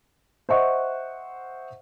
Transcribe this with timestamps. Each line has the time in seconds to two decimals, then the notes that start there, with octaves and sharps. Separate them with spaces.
0.49 C5 D#5 E5 F#5 C#6